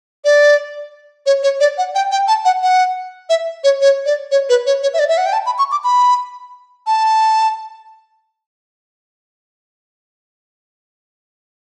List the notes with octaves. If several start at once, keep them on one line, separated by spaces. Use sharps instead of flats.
D5
C#5
C#5
D5
F#5
G5
G5
A5
F#5
F#5
E5
C#5
C#5
D5
C#5
B4
C#5
C#5
E5
D5
E5
F#5
G5
A5
B5
C#6
D6
B5
A5